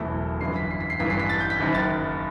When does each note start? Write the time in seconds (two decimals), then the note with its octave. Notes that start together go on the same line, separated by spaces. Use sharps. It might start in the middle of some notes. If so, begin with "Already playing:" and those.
Already playing: F#1 E2 B2 A3 E4
0.41 G1 F#2 E3 C7
0.56 B6
0.71 C7
0.80 B6
0.90 C7
1.00 A1 G2 E3 B6
1.10 C7
1.20 B6
1.29 A6
1.40 G6
1.50 B6
1.60 F#1 F#2 D#3
1.74 A6